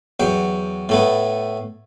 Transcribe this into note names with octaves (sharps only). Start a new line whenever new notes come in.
E2 F#3 G5
A2 A3 B3